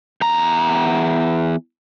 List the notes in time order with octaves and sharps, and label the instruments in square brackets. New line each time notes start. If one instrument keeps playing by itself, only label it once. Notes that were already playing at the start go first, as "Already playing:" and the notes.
[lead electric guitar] E2 A#5